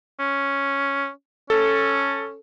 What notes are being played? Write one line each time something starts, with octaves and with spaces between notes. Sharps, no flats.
C#4
C#4 A4